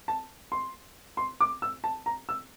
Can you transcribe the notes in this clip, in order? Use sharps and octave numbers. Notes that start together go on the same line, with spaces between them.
A5
C6
C6
D6
E6
A5
A#5
E6